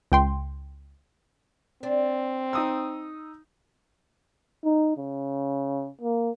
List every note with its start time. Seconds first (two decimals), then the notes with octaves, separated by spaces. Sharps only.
0.12 C#2 G5 C6
1.83 C4 D4
2.53 D#4 D#6 E6
4.64 D#4
4.97 C#3
6.01 A#3